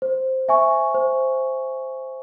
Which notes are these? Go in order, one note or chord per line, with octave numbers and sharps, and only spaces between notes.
C5
E5 G#5 C#6
C5